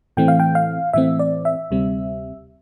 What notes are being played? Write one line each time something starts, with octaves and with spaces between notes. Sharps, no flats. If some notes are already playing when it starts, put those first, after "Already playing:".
A2 E3 A3 C4 G5
F5
G5
F5
A2 E3 A3 C4 E5
D5
E5
D2 C3 G3 C4